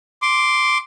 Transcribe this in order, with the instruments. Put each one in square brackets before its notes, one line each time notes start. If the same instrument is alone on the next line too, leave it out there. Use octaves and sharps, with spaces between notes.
[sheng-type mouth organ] C6 D6